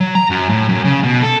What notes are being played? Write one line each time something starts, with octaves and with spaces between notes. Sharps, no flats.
F#3
A#5
F#2
A2
F#2
C#3
B2
A4